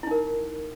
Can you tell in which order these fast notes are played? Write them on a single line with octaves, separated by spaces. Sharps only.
E4 D#4 A#4